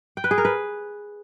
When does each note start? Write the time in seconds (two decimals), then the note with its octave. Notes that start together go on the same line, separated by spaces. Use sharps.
0.17 G5
0.24 B4
0.31 G#4
0.38 A#4
0.45 B4